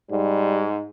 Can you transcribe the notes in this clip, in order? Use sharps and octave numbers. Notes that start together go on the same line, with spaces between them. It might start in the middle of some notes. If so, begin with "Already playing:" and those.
G#2 G3